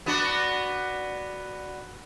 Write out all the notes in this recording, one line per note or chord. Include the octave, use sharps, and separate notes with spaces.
B3 D4 F#4